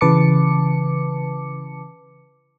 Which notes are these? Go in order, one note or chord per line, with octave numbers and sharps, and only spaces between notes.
C#3 E3 B4 A5 D6 C#7